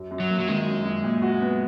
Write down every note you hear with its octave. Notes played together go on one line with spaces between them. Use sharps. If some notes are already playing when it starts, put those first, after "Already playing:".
Already playing: F#2
F#2
F#3
A#3
F#3
D#3 G#3
F#2
F#2
A#2
F#4
B3